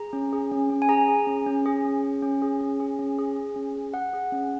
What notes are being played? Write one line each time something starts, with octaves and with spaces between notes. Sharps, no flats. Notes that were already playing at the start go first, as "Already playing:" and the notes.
Already playing: G#4 A#5
C#4
G#4
C#4
C#4
G#5
G#4 A#5
G#4
C#4
C#4
G#4
C#4
C#4
C#4
G#4
C#4
G#4
C#4
G#4
G#4
C#4
G#4
G#4 F#5
G#4
C#4